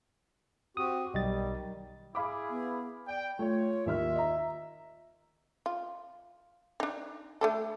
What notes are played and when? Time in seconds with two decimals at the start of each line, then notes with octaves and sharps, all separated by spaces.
0.77 C4 F#4 G4 D#6
1.14 B1 D#3 G3 D#5 A6
2.15 E4 G#4 F5 B5 D6
2.50 B3
3.08 D5 G5
3.39 A3 F4 C#5
3.86 D#2 D#3 E5 F6
4.16 D#5 A#5
5.66 F4
6.80 D4 D#4
7.41 A3 D4 A4